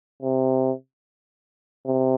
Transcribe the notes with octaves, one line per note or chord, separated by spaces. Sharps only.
C3
C3